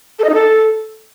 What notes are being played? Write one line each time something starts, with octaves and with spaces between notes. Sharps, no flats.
A4
D#5
D#4
A4